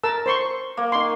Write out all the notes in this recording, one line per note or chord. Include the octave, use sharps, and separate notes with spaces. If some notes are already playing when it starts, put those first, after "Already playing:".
A#4 A5 E6
C5 C6 C#6
A#3
D#3 C6 C#6